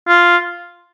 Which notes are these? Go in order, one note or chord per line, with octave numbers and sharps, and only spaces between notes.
F4